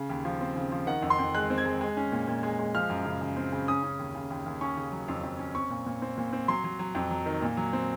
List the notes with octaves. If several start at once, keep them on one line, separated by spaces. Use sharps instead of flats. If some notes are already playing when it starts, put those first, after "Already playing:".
Already playing: C#3
D#2
F3
C4
C#3
F3
D#3 F#5
F2
C6
F2
G#3 F#6
C4
G#6
G#3
G#3
C#4
A#2
A#2
G#3
G#3
F3 F6
F#2
C#3
C#3
C4
C#3
C#4 D#6
C#4
D#2
C#3
D#2
D#2
C#4 C#6
C#3
F#3
F2
F2
C#4
C4 C#6
A#2
A#2
C4
A#2
C4
F#3 C6
F#3
F#3
F2
F#3
D#3
A#2
F#3
C4